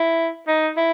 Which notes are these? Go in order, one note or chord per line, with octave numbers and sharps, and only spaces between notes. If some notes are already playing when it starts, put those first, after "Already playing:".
Already playing: E4
D#4
E4